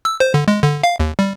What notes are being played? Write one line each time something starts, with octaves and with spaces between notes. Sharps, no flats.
E6
C5
D3
G#3
D3
F5
D#2
G3